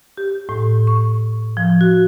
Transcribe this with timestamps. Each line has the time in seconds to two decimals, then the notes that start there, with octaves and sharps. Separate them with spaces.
0.17 G4
0.49 A2
0.87 C#6
1.57 F3
1.81 F#4